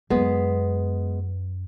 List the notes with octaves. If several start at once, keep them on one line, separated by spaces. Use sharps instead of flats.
F#2 G#3 B3